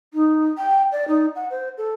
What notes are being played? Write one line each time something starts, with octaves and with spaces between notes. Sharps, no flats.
D#4
G5
D5
D#4
F#5
C5
A4